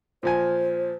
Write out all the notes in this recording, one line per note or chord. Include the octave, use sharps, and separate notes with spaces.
A#2 F3 C5 G#5